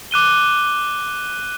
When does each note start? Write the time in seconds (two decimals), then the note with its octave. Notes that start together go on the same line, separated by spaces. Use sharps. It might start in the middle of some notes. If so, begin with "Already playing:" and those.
0.11 D6 F#6 D#7 G7